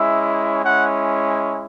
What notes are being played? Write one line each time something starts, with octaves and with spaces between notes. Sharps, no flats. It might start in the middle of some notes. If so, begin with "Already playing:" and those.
Already playing: G#3 C#4 E4 E5
G#3 C#4 E4 F#5